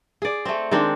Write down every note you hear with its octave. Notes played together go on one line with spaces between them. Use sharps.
G#4 D5
A3 C4
D#3 G#3 C4 D4